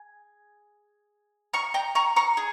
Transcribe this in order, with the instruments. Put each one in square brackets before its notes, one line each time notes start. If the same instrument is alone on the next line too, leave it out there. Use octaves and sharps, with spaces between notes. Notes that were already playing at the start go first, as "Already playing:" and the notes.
Already playing: [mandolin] G#4
A#5 C#6
G5 A#5
A#5 C#6
A#5 C#6
G#4